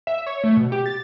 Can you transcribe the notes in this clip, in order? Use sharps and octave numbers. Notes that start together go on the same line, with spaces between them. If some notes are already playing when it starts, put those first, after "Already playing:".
E5
C#5
A3
B2
G4
A6